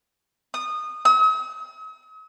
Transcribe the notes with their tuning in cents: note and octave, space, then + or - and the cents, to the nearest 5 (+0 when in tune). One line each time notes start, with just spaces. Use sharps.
D#6 -20
D#6 +45